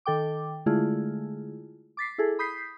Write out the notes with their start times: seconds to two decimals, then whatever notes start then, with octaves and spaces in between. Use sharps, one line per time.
0.06 D#3 A4 G5 D6
0.66 D3 G#3 A3 E4 F4 G#4
1.97 D6 A6 B6 C7
2.18 E4 G#4 A4
2.39 B5 D#6 G6 B6 C7